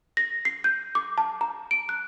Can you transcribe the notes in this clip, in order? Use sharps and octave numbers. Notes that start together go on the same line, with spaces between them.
A#6
C7
G6
D6
A5
A#5
D7
F#6